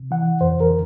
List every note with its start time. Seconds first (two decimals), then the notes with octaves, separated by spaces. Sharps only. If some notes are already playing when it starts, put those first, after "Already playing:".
Already playing: C3
0.11 E3 F#5
0.41 F2 C5
0.60 A#4
0.70 D3